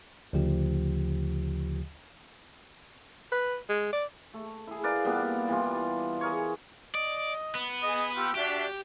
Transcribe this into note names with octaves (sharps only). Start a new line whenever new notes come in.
D2 C#3 F3 G4
B4
G#3
D5
A3
E4 G#4
A#4 B4 D5 F5
A#2 G3 B3 D4
E3 G3 F4
G#4 A#4 C#5
D5 D#5
B3
G#4 D#5 D#6
F4 G4 E6
D4 F#4 G4 E5